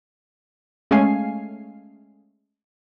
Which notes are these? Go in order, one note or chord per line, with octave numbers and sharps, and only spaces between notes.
G#3 A3 C#4 F5 G#5 C7